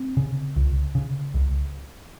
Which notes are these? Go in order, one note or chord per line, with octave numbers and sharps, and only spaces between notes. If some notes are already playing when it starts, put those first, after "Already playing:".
Already playing: C4
C#3
C#2
C#3
C#2